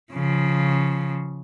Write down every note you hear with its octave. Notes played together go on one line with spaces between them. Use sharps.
C#3 F3